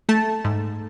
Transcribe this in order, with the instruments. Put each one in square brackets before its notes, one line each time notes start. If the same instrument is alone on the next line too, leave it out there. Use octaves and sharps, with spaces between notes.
[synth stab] A3 A5
G#2